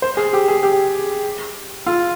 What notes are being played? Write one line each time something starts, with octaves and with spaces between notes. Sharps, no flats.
C5
G#4
G4
G#4
G4
F4